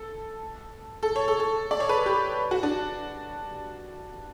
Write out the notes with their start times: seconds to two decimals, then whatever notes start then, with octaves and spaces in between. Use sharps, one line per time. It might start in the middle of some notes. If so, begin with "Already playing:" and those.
Already playing: A4
1.03 A4
1.16 C#5
1.28 A4
1.40 A4
1.71 D5
1.80 C#5
1.89 B4
2.06 G4
2.51 F#4
2.63 D4